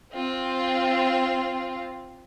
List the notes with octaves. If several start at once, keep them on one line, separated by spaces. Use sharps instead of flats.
C4 F4